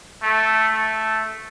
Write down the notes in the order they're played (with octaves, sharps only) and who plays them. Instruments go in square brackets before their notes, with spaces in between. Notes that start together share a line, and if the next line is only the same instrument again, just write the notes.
[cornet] A3
A3